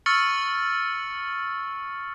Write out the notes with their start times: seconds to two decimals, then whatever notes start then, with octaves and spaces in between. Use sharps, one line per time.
0.06 C#6 E6 F6 A6 C#7 F#7